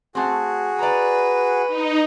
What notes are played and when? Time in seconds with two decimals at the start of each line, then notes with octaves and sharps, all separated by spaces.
0.15 A3 C4 F#4 G#4
0.79 B4 D5 A#5
1.68 D#4